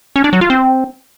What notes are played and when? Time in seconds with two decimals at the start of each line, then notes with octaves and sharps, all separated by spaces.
0.16 C#4
0.24 D4
0.33 F#3
0.41 F4
0.50 C4